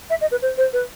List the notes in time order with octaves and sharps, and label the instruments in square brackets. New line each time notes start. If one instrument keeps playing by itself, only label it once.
[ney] E5
D#5
B4
C5
C5
B4